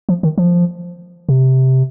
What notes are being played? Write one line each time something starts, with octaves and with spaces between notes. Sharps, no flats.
F3
D#3
F3
C3